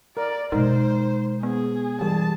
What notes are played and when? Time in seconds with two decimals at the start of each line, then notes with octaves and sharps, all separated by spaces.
0.17 A#4 D5
0.52 B2 G#3 D#4 A#4 C5
1.43 B3 G#4
2.01 E3 G3 G#4 A5